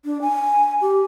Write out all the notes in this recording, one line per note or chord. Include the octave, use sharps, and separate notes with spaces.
D4
G#5
G4